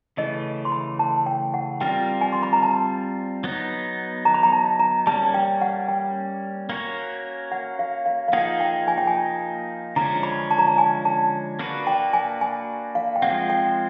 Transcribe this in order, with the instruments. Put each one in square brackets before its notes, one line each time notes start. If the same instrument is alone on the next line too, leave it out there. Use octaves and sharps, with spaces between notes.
[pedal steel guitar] C#3 E3 A3 [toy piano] D#5
[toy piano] C6
B5
A5
G5
F#5
[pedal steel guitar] G3 C4 F4 A#4 [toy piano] G5
[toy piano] G#5
C6
B5
A#5
A5
[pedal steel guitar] F#3 B3 D#4
[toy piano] A#5
B5
A#5
A5
A#5
[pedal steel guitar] G3 A#3 C#4 [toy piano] A5
[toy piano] G5
F#5
G5
[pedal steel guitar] A#3 C#4 F#4 A#4 C#5
[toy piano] F#5
F5
F5
F5
[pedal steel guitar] F3 A#3 D#4 G#4 [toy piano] F#5
[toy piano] G5
G#5
G5
G#5
[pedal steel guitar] D3 F3 G#3 C#4 [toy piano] A#5
[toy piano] B5
A5
A#5
A5
G#5
A5
[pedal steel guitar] A#3 D4 F#4 B4
[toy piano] G5
G#5
G#5
F5
G5
[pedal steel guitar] F3 G#3 C4 [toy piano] F#5
[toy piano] G5